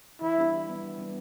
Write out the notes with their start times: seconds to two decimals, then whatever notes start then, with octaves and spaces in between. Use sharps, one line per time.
0.22 E3 E4
0.37 G3 B3 D4 G4
0.52 E3
0.68 G3 B3 D4 G4
0.83 E3
0.98 G3 B3 D4 G4